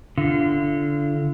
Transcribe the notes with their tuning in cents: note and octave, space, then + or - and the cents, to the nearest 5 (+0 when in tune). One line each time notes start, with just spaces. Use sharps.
D3 -15 F4 -35